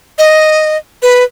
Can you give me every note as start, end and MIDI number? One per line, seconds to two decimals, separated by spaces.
0.19 0.77 75
1.03 1.23 71